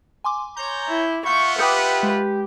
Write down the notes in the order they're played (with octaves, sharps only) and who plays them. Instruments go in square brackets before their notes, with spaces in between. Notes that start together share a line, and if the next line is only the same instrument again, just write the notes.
[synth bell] G#5 C6 D6
[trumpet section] C#5 A#5 [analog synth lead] G6
[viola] E4
[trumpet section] F4 E5 F#5 [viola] C#6 [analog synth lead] G6
[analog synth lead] G4 [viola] B4 [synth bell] G5 D#6 C#7
[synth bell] G#3